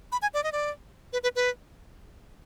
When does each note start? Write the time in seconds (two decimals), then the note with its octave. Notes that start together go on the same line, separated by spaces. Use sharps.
0.12 B5
0.22 G#5
0.34 D5
0.44 D#5
0.52 D5
1.13 B4
1.23 B4
1.36 B4